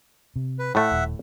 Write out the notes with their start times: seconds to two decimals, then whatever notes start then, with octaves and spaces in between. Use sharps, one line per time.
0.36 C3
0.59 B4
0.75 A2 A3 E5 F#5
0.91 D#1